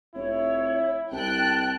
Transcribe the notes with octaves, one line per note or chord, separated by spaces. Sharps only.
F1 E4 C#5
C2 G5 A5 F#6